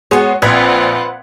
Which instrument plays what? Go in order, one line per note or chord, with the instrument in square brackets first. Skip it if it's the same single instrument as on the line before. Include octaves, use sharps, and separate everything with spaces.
[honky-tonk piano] G#3 F#4 G#4 [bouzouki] B3 C#5
[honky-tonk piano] A#1 G#6 B6 [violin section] C4 F4 F#5 [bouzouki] B4